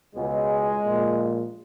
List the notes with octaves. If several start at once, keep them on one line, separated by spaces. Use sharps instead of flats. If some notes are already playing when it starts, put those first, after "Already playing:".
C#2 B2 G#3
A#1 A#2